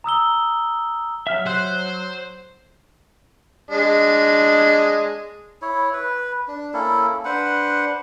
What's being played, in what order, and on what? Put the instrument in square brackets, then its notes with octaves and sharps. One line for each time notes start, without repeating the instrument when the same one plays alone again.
[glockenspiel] A#5 D#6 E6 G7
[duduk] F#3 [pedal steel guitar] E5 F6
[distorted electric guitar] C5 [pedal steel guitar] F#6
[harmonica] G#3 D4 D#5
[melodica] E4 C#5
B4
D4
A#3 C#4 E4 A4
D4 B4 C5 F#5